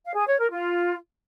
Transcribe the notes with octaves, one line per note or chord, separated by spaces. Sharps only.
F5
G#4
C#5
A#4
F4